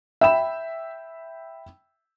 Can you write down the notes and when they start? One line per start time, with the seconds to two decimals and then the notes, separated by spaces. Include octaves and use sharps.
0.21 E5 G5 B5 E7